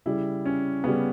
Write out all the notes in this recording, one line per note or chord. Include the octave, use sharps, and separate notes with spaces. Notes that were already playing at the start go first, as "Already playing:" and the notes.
C#3 G3 E4
C#4
C#3 G3 B3